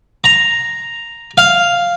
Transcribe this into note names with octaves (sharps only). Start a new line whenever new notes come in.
A#5
F5